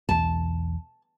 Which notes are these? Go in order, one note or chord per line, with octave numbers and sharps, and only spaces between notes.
B1 E2 A5